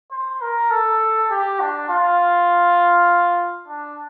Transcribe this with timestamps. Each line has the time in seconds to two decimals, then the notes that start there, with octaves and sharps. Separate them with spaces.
0.11 C5
0.41 A#4
0.71 A4
1.31 G4
1.60 D4
1.89 F4
3.68 D4